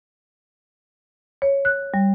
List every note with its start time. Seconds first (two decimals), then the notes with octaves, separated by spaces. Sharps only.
1.42 C#5
1.65 F#6
1.94 G3